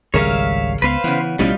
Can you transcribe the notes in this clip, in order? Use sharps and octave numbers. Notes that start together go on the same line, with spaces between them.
G#1 C#2 G3 G#4 A#4 C#5 E5 F5
C#2 B3 B4 C5 F5
C#3 E3 B3
A1 B2 E3 G3 C#4 D#4 F4